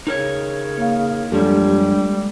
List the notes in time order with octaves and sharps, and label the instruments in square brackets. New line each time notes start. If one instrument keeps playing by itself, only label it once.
[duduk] C#3 [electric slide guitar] D#4 A#4 C#5
[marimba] A#3 F5
[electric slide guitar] F#2 F3 C#4 [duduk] G3 [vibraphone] G#3 D4 G4 [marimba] A4
[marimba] G#3